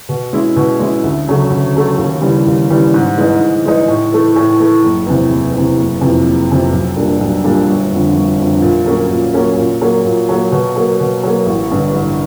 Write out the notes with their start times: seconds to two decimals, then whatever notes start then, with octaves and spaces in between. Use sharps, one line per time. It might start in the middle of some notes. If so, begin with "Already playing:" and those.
0.09 B2
0.33 G#3 C#4 E4
0.56 B2
0.80 G#3 C#4 E4
1.03 D2
1.28 C#3 F#3 A3
1.50 D2
1.74 C#3 F#3 A3
1.98 D#2
2.22 C#3 E3 G3
2.46 D#2
2.70 C#3 E3 G3
2.94 G#2
3.17 E3 G#3 B3 D#4
3.41 G#2
3.65 E3 G#3 B3 D#4
3.88 A2
4.12 E3 A3
4.36 A2
4.59 E3 A3
4.84 F#1
5.07 E2 C3
5.31 F#1
5.54 E2 C3
5.77 F#1
6.01 F2 C3 E3
6.25 F#1
6.49 F2 C3 E3
6.72 B1
6.96 A#2 G3 A#3 D4
7.20 B1
7.44 A#2 G3 A#3 D4
7.68 G1
7.91 F2 D3
8.15 G1
8.39 F2 D3
8.62 A#2
8.86 F#3 A#3 C#4
9.10 A#2
9.34 F#3 A#3 C#4
9.57 A#2
9.81 F#3 A#3
10.05 A#2
10.29 F#3 A#3
10.52 B2
10.76 F#3 A#3
11.00 B2
11.23 F#3 A#3
11.46 A1
11.71 G2 D3
11.94 A1